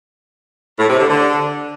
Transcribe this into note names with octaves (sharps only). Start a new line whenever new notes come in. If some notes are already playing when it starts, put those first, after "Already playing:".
A2
C3
D3
D3